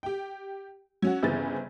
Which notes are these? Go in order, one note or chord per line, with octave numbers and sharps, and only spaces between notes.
G4 G5
F#3 C#4 F#4
G1 C#3 E3 B3 C4 A6